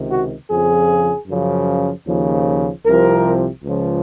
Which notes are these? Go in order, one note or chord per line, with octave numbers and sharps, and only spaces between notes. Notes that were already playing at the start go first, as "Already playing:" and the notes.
Already playing: C#2 C3 D#3
F#4
F2 C#3 F3 G#4
F#2 C#3 F3
D#2 C#3 F3
C2 C3 F3 A#4
C#2 C#3 F3